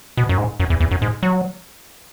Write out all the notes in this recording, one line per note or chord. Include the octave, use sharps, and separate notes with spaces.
B2
F#2
G#2
F#2
E2
E2
F#2
G#2
F#3